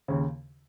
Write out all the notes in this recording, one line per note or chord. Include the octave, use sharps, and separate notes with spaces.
D#2 C#3